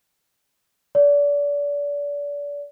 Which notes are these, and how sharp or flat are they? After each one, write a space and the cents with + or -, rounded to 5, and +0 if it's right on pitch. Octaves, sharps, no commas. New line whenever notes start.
D5 -30